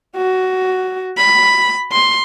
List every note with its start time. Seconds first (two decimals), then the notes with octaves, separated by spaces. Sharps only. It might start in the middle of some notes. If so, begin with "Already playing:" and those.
0.16 F#4
1.17 B5
1.92 C6